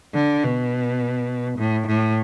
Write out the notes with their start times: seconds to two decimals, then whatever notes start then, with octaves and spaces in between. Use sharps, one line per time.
0.15 D3
0.44 B2
1.59 A2
1.87 A2